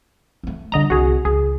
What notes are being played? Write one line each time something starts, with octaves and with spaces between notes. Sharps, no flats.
A3 C4
F2 D3 G3 D#5 A#5
C2 F#4 G#4
C#2 G#4